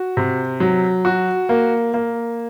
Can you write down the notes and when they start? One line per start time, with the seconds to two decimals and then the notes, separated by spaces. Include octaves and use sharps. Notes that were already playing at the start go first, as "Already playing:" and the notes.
Already playing: F#4
0.17 C3
0.60 F#3
1.05 F#4
1.49 A#3
1.94 A#3